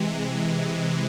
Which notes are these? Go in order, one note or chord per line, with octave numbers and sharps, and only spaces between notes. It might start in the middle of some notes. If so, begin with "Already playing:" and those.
Already playing: C3 E3 G#3